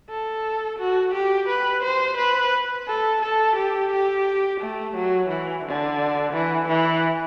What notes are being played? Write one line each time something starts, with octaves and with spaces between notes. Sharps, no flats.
A4
F#4
G4
B4
C5
B4
A4
A4
G4
G4
A3
F#3
E3
D3
E3
E3